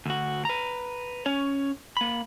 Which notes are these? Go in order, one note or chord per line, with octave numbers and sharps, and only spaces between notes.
D2 F#4
B4 A#5
C#4 C#5
A#3 B5